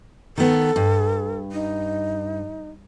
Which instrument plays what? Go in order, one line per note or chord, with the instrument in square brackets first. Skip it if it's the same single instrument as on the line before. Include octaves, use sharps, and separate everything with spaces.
[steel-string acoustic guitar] D#3 B3 [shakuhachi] A4
[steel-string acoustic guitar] G2
[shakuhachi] D#4